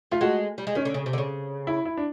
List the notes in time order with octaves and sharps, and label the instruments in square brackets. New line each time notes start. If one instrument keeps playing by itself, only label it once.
[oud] A3 [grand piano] F4
[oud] G#3 [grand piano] F#4
[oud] G3
G#3
[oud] D#3 [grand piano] C#4
[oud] D3
C#3
C3
D3
C#3
[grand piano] E4
E4
D4